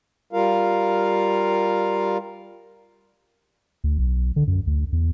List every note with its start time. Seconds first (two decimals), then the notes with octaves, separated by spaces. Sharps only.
0.33 G3 F4 A#4 F5
3.84 D2
3.98 B1
4.36 D3
4.47 F#2
4.67 D2
4.92 E2